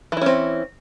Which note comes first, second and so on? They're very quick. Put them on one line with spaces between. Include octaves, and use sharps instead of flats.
E3 E4 C#4 C4